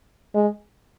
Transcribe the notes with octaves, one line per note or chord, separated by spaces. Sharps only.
G#3